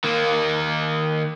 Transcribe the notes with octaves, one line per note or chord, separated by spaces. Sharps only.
D#3 A#3